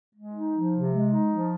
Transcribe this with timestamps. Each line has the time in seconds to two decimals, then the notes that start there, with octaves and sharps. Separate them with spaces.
0.15 G#3
0.34 D#4
0.53 F3
0.73 C3
0.92 G#3
1.11 D#4
1.31 F3